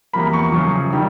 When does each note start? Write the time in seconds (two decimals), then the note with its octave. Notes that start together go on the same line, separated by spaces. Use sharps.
0.13 E2 C3 F3 A#3 B5
0.33 C#6
0.52 F#2 C#3 F3
0.92 D#3 G3